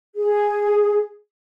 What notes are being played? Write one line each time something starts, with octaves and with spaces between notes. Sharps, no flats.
G#4